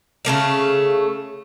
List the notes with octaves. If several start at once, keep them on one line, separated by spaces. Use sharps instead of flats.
C#3 A3 A#3 F5